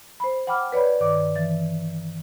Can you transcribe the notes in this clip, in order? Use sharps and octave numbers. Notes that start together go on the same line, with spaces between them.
C5 B5
F#5 G5 B5 D6 F6
B4 C#5 D5 B5
G2 D#3 D5 D6
E3 A6